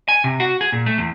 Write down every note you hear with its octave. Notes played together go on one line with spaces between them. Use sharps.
G#5
C3
F#4
G#4
A#2
A3
E2